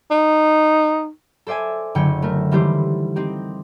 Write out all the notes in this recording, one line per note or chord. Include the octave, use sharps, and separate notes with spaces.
D#4
A4 C5 D5 E5 G#5
F#1 D3 F#3 G5 C#7
A3 A#4
D#3 E3 G3 A3 G4 C5
C4 D#4 G4